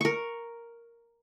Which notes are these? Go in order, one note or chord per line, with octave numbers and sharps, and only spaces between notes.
A#4 C#6